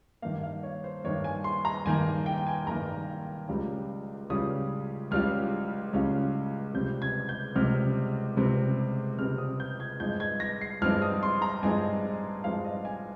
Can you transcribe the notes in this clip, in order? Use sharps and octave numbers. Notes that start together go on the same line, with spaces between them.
G2 D#3 A#3 F5
F5
C#5
C5
G2 D#3 A#3 C#5
G#5
C6
A#5
G2 D#3 A#3 G#5
G5
G#5
G2 D#3 A#3 A#5
C#2 C#3 G3 C#4 F4
C#2 C#3 G3 C#4 F4 D#6
C#2 C#3 G3 C#4 F4 F6
C#2 C#3 G3 C#4 F4
C#2 C3 G3 C4 G6
G#6
G6
C#2 C3 G3 C4 F6
C#2 C3 G3 C4
C#2 C3 G3 C4 F6
D#6
G6
G#6
G2 F3 G#3 C4 D#4 G6
G#6
A#6
C7
G2 F3 G#3 C4 D#4 F6
D#6
C6
A#5
G2 F3 G#3 C4 D#4 G#5
G2 F3 G#3 C4 D#4 F5
D#5
G#5